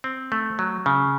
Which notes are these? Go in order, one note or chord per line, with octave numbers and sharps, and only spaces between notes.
C4
A3
F#3
C#3